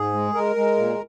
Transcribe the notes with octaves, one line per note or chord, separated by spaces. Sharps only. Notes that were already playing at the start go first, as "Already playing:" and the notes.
Already playing: G#2 G#4
G#3
G#3 A#4
G#3
A#2